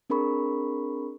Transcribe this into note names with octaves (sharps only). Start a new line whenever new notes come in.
C4 D4 G#4 A#4 B5 C#6